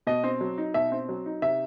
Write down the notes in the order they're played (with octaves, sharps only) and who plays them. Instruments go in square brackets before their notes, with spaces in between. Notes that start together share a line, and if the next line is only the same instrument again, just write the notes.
[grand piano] B2 [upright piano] D#5
[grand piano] C4
F#3
D#4
[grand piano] B2 [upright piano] E5
[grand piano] C4
F#3
D#4
[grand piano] C3 [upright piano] E5